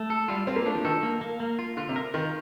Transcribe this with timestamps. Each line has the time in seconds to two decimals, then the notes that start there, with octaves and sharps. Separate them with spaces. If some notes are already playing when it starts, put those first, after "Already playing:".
Already playing: A3
0.10 A4
0.28 G3 F4
0.47 C4 F4
0.56 A#3
0.65 A3 D4
0.75 F3
0.85 D#3 A4
1.03 A#3
1.21 A#3
1.40 A#3
1.59 F4
1.77 D3 F4
1.89 C3
1.96 A#4
2.14 D#3 F4